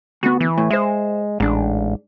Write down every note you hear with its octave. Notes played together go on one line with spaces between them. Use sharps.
D2 B3 F#4
E3
A2
G#3 C5 E5
A1 G#2 D4